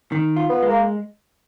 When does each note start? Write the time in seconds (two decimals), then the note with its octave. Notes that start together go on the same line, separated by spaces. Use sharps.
0.12 D#3
0.36 F4
0.49 B3
0.63 G#3
0.68 A#3